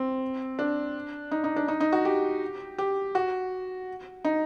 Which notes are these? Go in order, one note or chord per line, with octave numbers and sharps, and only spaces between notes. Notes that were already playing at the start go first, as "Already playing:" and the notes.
Already playing: C4
D4
D#4
D#4
D4
D#4
D#4
F#4
G4
G4
F#4
D#4